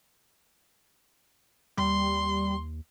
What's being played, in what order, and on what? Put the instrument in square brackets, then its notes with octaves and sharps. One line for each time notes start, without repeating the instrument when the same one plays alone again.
[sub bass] D#2 [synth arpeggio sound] G3 [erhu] C6